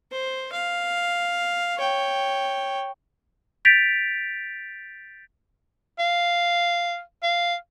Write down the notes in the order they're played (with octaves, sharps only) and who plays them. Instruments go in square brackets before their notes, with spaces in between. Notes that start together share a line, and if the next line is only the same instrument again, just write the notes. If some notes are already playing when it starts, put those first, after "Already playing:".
[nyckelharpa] C5
F5
C#5 G5
[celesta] G6 A6 B6 D7 F7
[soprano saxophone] F5
F5